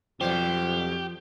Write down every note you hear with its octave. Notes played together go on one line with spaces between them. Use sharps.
F2 B2 F3 F#3 G4 C5